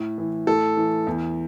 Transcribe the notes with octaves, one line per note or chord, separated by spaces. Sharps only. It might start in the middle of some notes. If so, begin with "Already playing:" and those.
Already playing: A2
E3
A2 A4
E3
E2